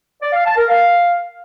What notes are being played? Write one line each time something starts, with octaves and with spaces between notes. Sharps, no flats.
D5
F5
A5
A#4
F5